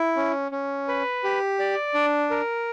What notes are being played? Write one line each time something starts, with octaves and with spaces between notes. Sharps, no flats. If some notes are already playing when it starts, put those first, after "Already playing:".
Already playing: E4
C#4
C#4
B4
G4
D5
D4
A#4